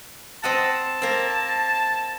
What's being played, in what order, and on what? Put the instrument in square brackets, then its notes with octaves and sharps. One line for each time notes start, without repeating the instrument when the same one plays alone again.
[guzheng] C4 D#5 F#5 [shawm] A5
[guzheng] A#3 C4